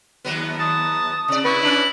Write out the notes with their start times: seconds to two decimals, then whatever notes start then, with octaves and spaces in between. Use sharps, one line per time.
0.25 D#2 F#3 B3
0.60 A5 D#6
1.28 C3 D5
1.45 E4 B4 C#6
1.63 C#4 D4 F#7